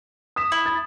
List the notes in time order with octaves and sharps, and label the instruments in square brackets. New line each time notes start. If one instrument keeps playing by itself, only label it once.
[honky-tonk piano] D#6 B6 E7
[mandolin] E4
[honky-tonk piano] A6